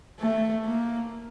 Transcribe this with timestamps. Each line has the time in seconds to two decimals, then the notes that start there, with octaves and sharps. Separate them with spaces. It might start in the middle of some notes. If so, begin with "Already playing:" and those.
0.20 A3
0.65 A#3